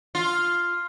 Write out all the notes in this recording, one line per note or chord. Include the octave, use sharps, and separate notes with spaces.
F4